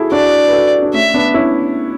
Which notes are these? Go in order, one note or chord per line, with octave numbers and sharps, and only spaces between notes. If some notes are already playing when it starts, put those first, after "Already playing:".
Already playing: E4 F#4 G#4 A4
D4 F#4 D5
B4
F#4 A4
D4
A3 C#4 E5
B3 D4
C#4 E4